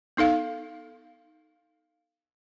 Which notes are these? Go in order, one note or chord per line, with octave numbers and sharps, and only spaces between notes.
B3 D#4 A4 F5